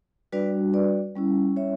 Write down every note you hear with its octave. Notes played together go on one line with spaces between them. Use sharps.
G3 D4 F#4 B4 D5
B4 D5
G3 C#4 E4
C#5 E5